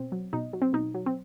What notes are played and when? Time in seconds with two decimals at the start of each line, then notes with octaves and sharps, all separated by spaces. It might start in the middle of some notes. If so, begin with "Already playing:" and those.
Already playing: B2 C4
0.12 F#3
0.33 B2 D#4
0.53 F#3
0.62 C4
0.73 B2 D#4
0.94 F#3
1.06 C4